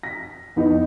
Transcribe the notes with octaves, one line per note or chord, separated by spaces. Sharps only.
A#6 B6
F2 B3 D#4 E4